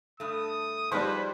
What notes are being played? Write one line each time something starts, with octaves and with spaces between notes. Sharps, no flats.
G2 A3 D#6
F3 G3 G#3 D#4 B4 C5